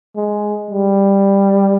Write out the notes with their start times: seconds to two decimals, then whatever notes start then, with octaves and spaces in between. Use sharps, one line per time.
0.16 G#3
0.71 G3